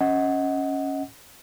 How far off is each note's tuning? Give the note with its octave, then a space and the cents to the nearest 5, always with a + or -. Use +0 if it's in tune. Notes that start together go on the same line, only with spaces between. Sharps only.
C#4 +0 D#5 +25 F#5 +0